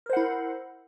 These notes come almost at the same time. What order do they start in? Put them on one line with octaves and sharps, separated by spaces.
A#4 C5 F#5 E4